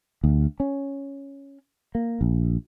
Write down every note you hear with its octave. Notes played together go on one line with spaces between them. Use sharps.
D2
C#4
A#3
A#1